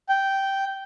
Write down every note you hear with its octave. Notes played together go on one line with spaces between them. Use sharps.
G5